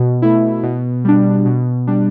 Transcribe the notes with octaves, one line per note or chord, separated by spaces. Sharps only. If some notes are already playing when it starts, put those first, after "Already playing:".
Already playing: B2
A3 E4
B2
G3 D4
B2
G3 D4